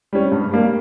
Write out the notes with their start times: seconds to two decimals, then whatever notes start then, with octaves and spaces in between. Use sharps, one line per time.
0.13 G3 C#4
0.32 G2
0.51 G3 A#3